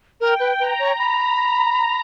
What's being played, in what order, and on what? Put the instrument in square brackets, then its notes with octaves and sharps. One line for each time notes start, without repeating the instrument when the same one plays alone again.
[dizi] A#4 [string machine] G5
[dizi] B4
[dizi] B4 [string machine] A#5
[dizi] C#5
B5